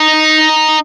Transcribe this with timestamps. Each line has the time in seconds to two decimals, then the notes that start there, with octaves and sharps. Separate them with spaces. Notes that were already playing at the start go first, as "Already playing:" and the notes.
Already playing: D#4